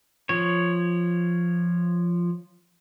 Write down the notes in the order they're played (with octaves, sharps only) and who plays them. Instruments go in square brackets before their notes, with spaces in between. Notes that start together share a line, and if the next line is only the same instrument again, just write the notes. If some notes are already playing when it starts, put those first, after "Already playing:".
[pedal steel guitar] F3 C#5